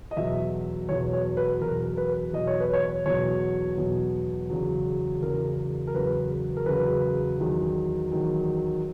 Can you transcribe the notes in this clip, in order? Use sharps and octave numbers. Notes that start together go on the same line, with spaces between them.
D#5
E2 B2 F#3 E5
E2 B2 F#3 C#5
C#5
B4
E2 B2 F#3 A#4
B4
E2 B2 F#3 D#5
C#5
B4
C#5
E2 B2 F#3 C#5
E2 B2 F#3
E2 C#3 F#3
E2 C#3 F#3 A#4
A#4
E2 C#3 F#3 B4
A#4
E2 C#3 F#3 B4
E2 D#3 F#3
E2 D#3 F#3